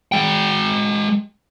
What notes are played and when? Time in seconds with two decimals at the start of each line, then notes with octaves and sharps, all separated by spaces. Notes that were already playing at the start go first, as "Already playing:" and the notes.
0.12 G#3 G5